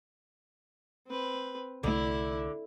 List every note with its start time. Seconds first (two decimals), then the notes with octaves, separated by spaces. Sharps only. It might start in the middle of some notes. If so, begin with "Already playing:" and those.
1.07 C4 B4
1.83 C2 D3 A3 E4 E5